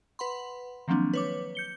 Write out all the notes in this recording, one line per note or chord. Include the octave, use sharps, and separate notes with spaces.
B4 F#5 B5 C6
D#3 F3 F#3 A#3 C4 D4
B4 C#5 D6
G6 C#7 G7